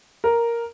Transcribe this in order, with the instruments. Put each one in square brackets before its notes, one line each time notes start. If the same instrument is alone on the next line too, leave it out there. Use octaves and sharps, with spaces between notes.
[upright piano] A#4